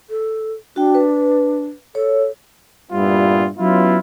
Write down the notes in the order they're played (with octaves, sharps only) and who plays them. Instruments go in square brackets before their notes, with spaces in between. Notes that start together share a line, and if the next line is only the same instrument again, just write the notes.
[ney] A4
[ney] D4 [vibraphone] F#4 G5
[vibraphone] B4
[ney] A4 [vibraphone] C#5
[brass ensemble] G2 A#2 G3 B3 E4 F4
F#3 B3 C#4 E4 F4